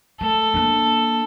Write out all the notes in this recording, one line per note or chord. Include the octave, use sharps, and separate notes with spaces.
A3 A4
A#3 D4